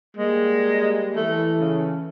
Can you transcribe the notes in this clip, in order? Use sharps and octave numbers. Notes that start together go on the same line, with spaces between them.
G3 G#3 A#3
E3 A3 A4
C#3